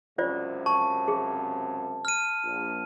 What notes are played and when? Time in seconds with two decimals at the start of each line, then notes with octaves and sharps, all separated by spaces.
0.18 C#2 F#2 C3 F4 C5 D5
0.66 A5 C#6
1.08 G#4
2.05 F6 D#7
2.44 A#1